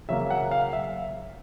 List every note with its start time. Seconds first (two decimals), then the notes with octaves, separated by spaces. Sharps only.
0.09 C#3 F#3 A#3 E5
0.30 F#5
0.51 F5
0.73 E5